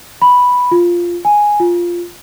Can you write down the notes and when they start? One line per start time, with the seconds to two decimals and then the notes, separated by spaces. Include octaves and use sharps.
0.22 B5
0.71 F4
1.25 G#5
1.60 F4